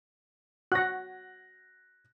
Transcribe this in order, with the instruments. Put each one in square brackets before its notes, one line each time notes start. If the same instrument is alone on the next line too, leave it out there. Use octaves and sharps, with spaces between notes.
[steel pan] F#4 F#5 [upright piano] F#6 A#6